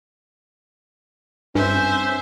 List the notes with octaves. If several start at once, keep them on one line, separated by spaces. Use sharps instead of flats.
G2 C4 C#4 C5 E5